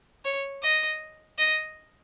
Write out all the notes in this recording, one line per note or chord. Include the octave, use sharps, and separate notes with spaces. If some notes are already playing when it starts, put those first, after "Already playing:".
C#5
D#5
D#5